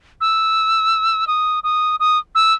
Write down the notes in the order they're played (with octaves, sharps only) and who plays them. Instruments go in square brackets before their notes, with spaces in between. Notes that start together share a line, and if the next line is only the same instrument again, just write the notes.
[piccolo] E6
D#6
D#6
D#6
E6